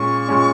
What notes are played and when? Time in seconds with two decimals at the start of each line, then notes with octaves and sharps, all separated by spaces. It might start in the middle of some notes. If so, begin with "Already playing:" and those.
Already playing: A#2 G#3 C#4 C#6
0.28 A#2 G#3 C#4